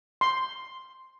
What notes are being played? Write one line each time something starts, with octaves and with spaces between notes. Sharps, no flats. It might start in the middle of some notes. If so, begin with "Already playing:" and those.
C6